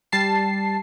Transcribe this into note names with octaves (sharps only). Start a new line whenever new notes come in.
G3 A5 C7